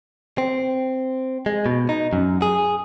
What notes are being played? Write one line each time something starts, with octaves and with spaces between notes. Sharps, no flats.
C4
G#3
B2
D#4
F#2
G#4